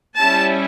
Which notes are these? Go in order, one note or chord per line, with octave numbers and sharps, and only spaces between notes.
G3 C#4 E4 A5